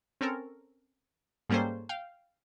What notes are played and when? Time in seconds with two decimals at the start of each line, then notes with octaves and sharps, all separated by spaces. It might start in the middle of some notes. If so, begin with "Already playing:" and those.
0.21 C4 C#4 A4 A#4
1.49 G#2 G3 A#3 C#4 A4 C5
1.89 F5 G5